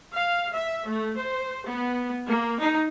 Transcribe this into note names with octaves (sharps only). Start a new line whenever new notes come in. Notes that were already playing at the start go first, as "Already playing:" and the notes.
F5
E5
A3
C5
B3
A#3
D#4